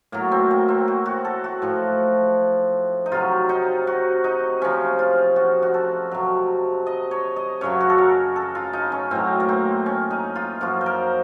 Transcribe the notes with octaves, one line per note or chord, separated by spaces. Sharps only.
A2 F#3 A#3
C4
A#3
C4
F#4
F#4
A4
F#4
A2 F3
D#4
C3 F#3 F4
D#4
F#4
D#4
C3 F3 C#4
F4
F#4
F#4
A4
C3 F#3
D#5
C#5
D#5
F#2 C#3 F#3 C#5
F#4
A4
A#4
A4
F4
D#4
C#4
A2 F#3 C4
A#3
C4
C#4
D#4
F4
F#2 F3 F#4
C5
A#4